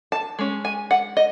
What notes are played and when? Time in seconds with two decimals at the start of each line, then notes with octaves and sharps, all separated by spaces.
0.12 A5
0.39 G#3 C#4
0.65 G#5
0.91 F#5
1.17 D#5